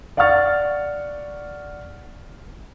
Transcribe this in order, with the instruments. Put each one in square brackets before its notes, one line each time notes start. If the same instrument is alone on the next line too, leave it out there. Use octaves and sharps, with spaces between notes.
[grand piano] D5 F5 F#5 C#6 F6 A6